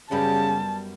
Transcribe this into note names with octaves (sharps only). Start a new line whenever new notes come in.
F#2 C#3 G3 B3 A5